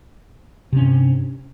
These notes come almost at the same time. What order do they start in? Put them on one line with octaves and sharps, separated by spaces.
C3 C#4 G2